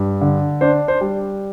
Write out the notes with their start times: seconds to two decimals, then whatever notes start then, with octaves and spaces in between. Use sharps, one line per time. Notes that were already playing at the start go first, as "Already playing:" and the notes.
Already playing: G2
0.21 D3
0.61 D4 C5
0.88 C5
1.01 G3